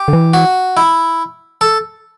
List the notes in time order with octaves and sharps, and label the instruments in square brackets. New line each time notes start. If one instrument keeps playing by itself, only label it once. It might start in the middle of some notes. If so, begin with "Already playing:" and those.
Already playing: [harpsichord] G4
[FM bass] D3
E3
[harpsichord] F#4
E4
A4